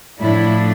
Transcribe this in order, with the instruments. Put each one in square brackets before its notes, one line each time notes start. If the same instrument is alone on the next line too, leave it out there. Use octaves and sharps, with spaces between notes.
[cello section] A2 F3 A3 D4 E4